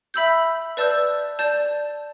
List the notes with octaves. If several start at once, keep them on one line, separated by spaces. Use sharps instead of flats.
E5 B5 E6 G6
B4 D5 A5 E6 G6
D5 A5 G6